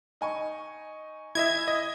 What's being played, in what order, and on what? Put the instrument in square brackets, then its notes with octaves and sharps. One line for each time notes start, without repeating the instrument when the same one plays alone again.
[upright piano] D#4 G#5 C#6
[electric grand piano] E4 D#5 E5 [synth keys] G#6
[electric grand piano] D#5